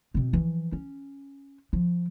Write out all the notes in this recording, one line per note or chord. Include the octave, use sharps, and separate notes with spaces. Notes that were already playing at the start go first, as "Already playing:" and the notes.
B2 C4
E3 F3
C#4
F3